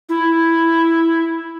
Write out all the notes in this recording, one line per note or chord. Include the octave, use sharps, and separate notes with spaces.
E4